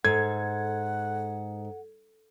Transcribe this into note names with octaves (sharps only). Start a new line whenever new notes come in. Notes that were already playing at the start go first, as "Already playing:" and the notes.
G#2 A4 F#5 G#6